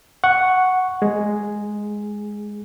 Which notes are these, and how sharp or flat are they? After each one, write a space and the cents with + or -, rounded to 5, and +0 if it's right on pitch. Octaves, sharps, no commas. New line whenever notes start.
F#5 +0 C#6 +0
G#3 +0 G#4 +0